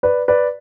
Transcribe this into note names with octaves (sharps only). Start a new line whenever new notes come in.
B4 D5
B4 D5